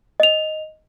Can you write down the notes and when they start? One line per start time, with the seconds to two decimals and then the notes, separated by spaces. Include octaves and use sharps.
0.20 D#5 F7